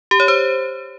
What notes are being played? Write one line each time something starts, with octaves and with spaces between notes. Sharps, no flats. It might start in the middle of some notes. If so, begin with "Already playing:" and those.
G4
C#5
C5